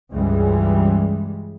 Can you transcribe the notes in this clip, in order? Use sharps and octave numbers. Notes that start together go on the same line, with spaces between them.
C#2 G2 C#3 E3 G3 G#3